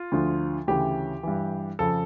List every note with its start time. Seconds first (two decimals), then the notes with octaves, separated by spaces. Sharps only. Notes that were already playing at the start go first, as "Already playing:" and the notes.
Already playing: F4
0.12 D2 D3 F3
0.67 D2 C#3 E3 G4
1.23 G2 E3
1.79 F2 C#3 F3 A4